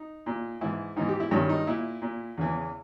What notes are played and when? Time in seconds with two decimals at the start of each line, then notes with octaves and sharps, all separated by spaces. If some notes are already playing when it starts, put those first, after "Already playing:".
Already playing: D#4
0.26 A#2
0.61 G#2 E3 E4
0.96 G#2 E3 D#4
1.09 G4
1.20 E4
1.31 G2 D#3 C#4
1.49 D#4
1.67 A#2 E4
2.02 A#2
2.38 E2 C#3 E3